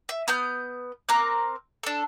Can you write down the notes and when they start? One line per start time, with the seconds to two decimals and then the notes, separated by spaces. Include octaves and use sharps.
0.09 E5
0.28 B3 D#6 F6 G6
1.09 C4 A#4 D6 F#6
1.83 D4 A4